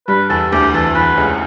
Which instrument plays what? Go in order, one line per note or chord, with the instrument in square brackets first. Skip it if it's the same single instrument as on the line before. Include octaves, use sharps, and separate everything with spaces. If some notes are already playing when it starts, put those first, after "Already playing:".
[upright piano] G2 G3 [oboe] B4
[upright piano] E2 E3 [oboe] A4
[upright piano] D2 D3 [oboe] G4
[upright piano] E2 E3 [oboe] A4
[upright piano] E2 E3 [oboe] B4
[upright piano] C#2 C#3